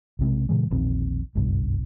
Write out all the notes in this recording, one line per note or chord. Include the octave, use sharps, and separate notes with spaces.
B1 C3 G#3
A#2 C#3 E3 G#3
E1 A#1 D#3 C4
F#1 C2 G2 B2